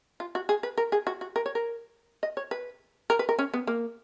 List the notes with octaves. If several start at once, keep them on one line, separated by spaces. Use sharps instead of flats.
F4
F#4
G#4
B4
A#4
G#4
F#4
F#4
A#4
C#5
A#4
D#5
C#5
B4
A#4
B4
A#4
C#4
B3
A#3